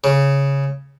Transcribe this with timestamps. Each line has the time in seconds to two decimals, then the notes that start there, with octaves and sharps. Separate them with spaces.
0.04 C#3